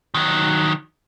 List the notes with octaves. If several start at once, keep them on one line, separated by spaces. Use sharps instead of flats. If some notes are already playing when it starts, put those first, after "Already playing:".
D#3 F#3